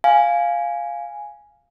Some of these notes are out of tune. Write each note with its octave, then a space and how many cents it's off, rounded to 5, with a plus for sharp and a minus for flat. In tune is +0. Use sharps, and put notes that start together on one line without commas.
F5 +0 G#5 +0